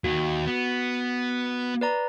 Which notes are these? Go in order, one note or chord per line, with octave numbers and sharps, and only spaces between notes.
D#2 F#4
B3
B4 D5 A#5